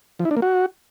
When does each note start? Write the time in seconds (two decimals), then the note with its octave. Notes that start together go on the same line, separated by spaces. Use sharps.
0.19 F3
0.25 E4
0.31 D4
0.37 A#3
0.42 F#4